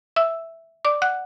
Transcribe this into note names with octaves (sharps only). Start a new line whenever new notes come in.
E5 E6
D5 D6
F#5 F#6